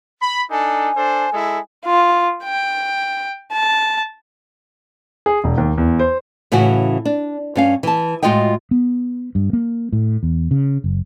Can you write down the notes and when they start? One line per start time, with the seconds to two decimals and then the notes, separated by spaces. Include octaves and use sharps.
0.22 B5
0.51 D4 D#4 A4 G#5
0.96 D4 A4 C5
1.33 G#3 E4 A4
1.85 F4
2.44 G5
3.52 A5
5.26 G#4
5.44 E1
5.58 D#2
5.78 E2
5.99 C5
6.52 A2 C#3 E3 C#4 F#4
7.05 D4
7.55 G2 C#4 F5
7.83 E3 A5
8.23 A2 G#3 F4 F#4 D#5 G5
8.71 B3
9.35 G2
9.53 A#3
9.93 A2
10.23 E2
10.51 C#3
10.84 F#1